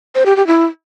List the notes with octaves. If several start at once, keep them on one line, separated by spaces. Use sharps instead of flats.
C5
G4
G4
E4